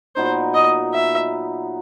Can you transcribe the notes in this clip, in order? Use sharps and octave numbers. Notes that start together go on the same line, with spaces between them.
A#2 F#3 B3 D#4 C5
D#5
E5